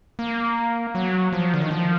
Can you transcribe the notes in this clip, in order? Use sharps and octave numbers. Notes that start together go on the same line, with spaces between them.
A#3
F#3
F3
D3
D#3
F3